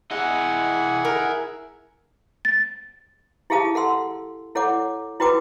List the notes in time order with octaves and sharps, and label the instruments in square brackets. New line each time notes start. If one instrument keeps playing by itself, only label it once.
[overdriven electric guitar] E3 D#5 [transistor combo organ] E4 G#4 [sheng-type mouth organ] F#5
[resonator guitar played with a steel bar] A#4
[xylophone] A6
[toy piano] E4 G4 G#4 F5 A5 D#6
A4 F#5 C6 E6
E4 A4 C#5 F#5 D6
E4 F#4 B4 G5 D6 D#6